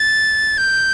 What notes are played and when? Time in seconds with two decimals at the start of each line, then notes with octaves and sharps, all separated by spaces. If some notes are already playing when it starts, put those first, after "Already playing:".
Already playing: A6
0.58 G6